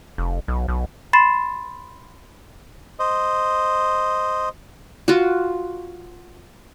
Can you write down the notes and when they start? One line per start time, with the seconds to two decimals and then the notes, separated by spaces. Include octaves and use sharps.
0.18 F1
0.48 B1
0.68 B1
1.13 B5 C6 A6 C7 E7
2.99 C5 D#5
5.08 F4 F#4